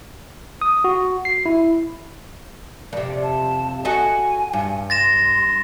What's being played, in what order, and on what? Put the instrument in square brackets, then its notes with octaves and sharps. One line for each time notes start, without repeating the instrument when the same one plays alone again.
[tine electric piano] D#6
F#4
C7
E4
[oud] F2 C3 [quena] D5
[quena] A5
[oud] F#4 A4 D#5 [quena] G#5
[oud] G2
[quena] C6 [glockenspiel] A6 A#6 E7